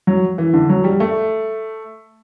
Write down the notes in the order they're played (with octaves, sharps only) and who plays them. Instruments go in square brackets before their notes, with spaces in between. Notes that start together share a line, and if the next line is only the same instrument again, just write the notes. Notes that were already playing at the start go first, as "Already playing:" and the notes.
[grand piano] F#3
E3
D3
F#3
G3
A3